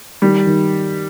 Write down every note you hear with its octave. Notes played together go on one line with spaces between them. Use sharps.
D#3 G3
D#3